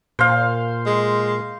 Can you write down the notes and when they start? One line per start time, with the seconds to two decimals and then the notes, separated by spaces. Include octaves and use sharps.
0.19 A#2 C5 F5
0.86 G#3